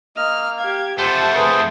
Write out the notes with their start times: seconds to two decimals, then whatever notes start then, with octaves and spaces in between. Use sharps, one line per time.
0.16 A#3 D#5 F6
0.59 G4 F5 G#6
0.98 F2 A3 G4 C5 F#5 A5
1.35 G#4 B4 C5